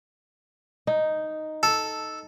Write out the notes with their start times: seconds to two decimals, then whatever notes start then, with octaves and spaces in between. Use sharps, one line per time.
0.87 D#4
1.63 A4